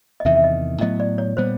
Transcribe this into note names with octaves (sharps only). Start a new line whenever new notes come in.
D#5
E2 C3 D#3 E5
E5
D#5
A2 F#3 B3 D#5
D5
C#5
A#2 G3 B3 C5